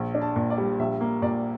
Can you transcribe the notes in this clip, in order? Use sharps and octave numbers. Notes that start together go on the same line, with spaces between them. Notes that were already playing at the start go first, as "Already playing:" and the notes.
Already playing: A#1
D4
A5
A#2
D5
G3
A#1 E5
A#3
A#2 D5